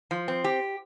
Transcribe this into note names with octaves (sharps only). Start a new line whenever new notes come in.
F3
C4
G4